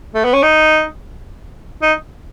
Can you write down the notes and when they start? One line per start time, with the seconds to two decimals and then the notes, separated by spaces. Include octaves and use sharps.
0.14 A3
0.24 B3
0.33 C#4
0.43 D#4
1.82 D#4